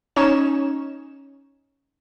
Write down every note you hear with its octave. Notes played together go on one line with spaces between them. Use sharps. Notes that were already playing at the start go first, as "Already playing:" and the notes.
C#4 D#4 C#5 E7